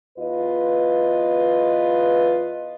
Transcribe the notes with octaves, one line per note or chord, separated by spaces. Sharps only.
E2 F4 B4 D#5